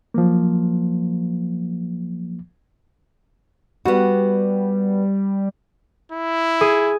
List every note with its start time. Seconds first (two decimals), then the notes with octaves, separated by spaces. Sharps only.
0.14 F3 F#3 A#3
3.85 G3 B3 F#4
6.12 E4
6.61 G#4